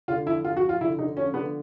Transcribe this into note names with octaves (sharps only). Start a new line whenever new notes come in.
D3 F4
F3 E4
F3 F4
F#4
F3
F4
D3 E4
D3 D#4
F3 C#4
D3 B3